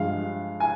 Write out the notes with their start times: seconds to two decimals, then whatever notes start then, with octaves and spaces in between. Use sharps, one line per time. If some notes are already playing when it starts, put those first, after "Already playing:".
Already playing: G2 F3 G#3 F5
0.60 G#5